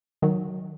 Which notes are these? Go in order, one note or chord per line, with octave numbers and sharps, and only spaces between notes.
D#3 F#3